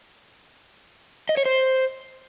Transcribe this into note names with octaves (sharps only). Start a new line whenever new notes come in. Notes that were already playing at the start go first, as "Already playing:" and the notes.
D#5
C#5
C5